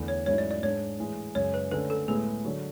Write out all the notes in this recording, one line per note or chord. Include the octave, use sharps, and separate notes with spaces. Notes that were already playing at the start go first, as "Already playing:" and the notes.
Already playing: E2 D3 A3
C#5
G#2 F#3 A3 C#4 E4 C#5
D5
D5
G#2 G#3 D4 C#5
A2 E3 G#3
F#2 C#3 G#3 C#5
B4
D3 A3 C#4 B4
A4
A2 G#3 B3 G#4
D3 F#3